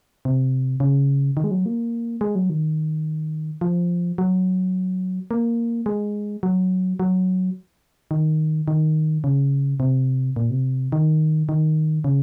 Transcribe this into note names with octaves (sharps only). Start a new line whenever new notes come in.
C3
C#3
D#3
G#3
F#3
A#3
G#3
F#3
D#3
F3
F#3
A#3
G#3
F#3
F#3
D#3
D#3
C#3
C3
A#2
C3
D#3
D#3
C#3